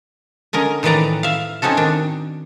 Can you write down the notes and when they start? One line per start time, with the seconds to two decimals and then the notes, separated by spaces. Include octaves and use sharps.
0.53 D3 C#4 A#4 D#5
0.83 A2 D#3 E3 B4 D5 A#5
1.23 E5 F5
1.62 C4 C#4 D#4 F#4 A4
1.77 D#3 D4